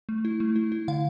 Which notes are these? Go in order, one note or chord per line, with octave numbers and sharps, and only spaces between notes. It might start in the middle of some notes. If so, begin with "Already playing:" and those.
A3
E4
A3
E4
E4
D3 F5